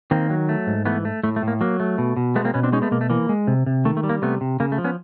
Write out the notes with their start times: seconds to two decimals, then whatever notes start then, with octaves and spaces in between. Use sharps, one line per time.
0.11 D#3 A#3 C4
0.30 F#3
0.49 A3
0.67 G#2
0.85 E3 A3 B3
1.05 A3
1.23 A2 A3
1.36 A3
1.42 A2
1.48 A#3
1.61 F#3 A#3
1.80 A3
1.98 B2
2.17 B2
2.35 G#3 A3 B3
2.45 A#3 C4
2.54 B2 B3 C#4
2.63 C4 D4
2.72 G#3 C#4 D#4
2.82 A3 B3
2.91 B2 A#3
3.01 A3
3.10 E3 A#3
3.29 G#3
3.47 C3
3.66 C3
3.85 D#3 A3
3.97 A3
4.03 G3
4.09 A#3
4.22 C3 A3 B3
4.41 C3
4.60 C#3 A#3
4.72 A3
4.78 F3
4.84 B3 C#4